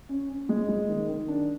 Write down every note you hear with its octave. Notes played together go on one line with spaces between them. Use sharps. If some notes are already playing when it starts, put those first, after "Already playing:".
C#4
C#4
G#3
G#3
D#3
D#3
D4